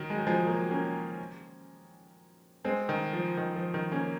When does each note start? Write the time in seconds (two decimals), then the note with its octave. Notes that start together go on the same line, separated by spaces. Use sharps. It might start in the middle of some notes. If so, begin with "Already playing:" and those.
Already playing: D#3 F#3
0.10 G#3
0.18 F#3
0.27 F3 G#3
0.46 F#3 A#3
0.70 A#3 C#4
2.65 G#3 C4
2.89 D#3
3.13 F3
3.37 D#3
3.56 F3
3.74 D#3
3.92 A#3 C#4